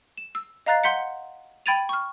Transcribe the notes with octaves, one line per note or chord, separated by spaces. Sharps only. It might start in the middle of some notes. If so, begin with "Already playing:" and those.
E7
E6
D#5 F5 A#5 F#6 A6 C7
F#5 C6 G6 B6 C#7
G5 B5 G#6 A6 D#7 F7
C#6 F6